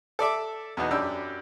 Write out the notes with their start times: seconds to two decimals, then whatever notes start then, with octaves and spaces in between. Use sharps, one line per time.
0.19 A4 D5 E5 D6
0.77 E2 B2 B3 D#4
0.91 F#2 D4 G4 B5 E6